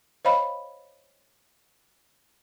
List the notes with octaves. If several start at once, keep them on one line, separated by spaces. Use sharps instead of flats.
C5 C#5 D#5 F5 B5